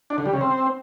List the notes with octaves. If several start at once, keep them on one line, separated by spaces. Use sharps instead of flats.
D4
D3
G3
C#3
C4